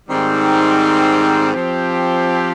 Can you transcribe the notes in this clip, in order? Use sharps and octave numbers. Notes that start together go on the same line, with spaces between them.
G#2 D#3 G3 C4
F3 C4 G4